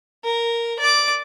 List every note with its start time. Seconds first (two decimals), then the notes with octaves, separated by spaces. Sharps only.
0.24 A#4
0.80 D5 D6